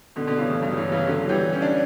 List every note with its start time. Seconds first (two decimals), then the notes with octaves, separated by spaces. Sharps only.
0.16 B2 D3
0.27 B2 D3
0.38 C#3 E3
0.49 A2 C#3
0.62 G2
0.71 F#3
0.77 C#3 E3
0.92 C#3 E3
1.07 D3 F#3
1.22 F#3
1.29 E3 G3
1.53 C#4
1.62 D4